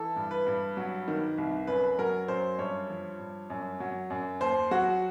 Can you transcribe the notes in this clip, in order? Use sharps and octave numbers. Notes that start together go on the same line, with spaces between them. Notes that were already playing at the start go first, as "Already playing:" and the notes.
Already playing: E3 A4
G2
B4
G2
F#3
D#3
C2
F#2 B4
F#3 A#4
F#2 C5
G2 C#5
F3
G2
F#2
F#3
F#2
D#2 C5
F#3 F#4